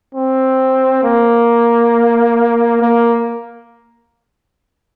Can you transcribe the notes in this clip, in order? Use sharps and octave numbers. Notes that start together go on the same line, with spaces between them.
C4
A#3
A#3